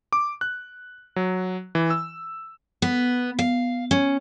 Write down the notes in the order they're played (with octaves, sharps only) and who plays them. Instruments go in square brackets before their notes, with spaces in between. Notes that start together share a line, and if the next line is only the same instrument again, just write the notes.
[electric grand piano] D6
F#6
F#3
E3
E6
[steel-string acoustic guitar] B3
F5
C#4